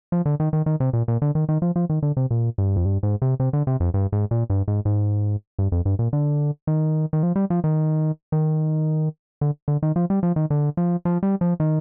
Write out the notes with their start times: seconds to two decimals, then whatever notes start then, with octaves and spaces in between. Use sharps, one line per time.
0.12 F3
0.26 D3
0.40 D#3
0.53 D#3
0.66 D#3
0.80 C3
0.93 A#2
1.08 A#2
1.22 D3
1.35 D#3
1.49 D#3
1.62 F3
1.76 F3
1.90 D#3
2.02 D3
2.17 C3
2.31 A#2
2.58 G2
2.76 F2
2.85 G2
3.03 G#2
3.22 C3
3.40 C3
3.53 D3
3.67 C3
3.80 F2
3.94 G2
4.12 G#2
4.31 A#2
4.50 G2
4.68 G#2
4.85 G#2
5.59 G2
5.72 F2
5.85 G2
5.99 A#2
6.13 D3
6.67 D#3
7.13 D#3
7.23 F3
7.36 G3
7.50 F3
7.64 D#3
8.32 D#3
9.41 D3
9.68 D3
9.83 D#3
9.96 F3
10.10 G3
10.23 F3
10.36 D#3
10.50 D3
10.77 F3
11.05 F3
11.23 G3
11.41 F3
11.60 D#3